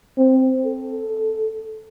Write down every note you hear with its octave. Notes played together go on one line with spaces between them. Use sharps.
C4
A4